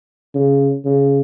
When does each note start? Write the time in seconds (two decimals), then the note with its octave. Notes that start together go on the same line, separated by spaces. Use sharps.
0.35 C#3
0.85 C#3